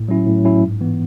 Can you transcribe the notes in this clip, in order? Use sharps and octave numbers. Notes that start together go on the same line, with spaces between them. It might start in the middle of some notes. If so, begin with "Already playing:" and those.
Already playing: A2
F#3 C#4 E4
A2
F#3 C#4 E4
G#2
E3 B3